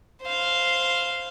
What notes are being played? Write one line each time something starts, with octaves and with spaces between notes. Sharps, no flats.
C5 F5